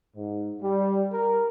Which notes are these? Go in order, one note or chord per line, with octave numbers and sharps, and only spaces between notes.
G#2
G3
A#4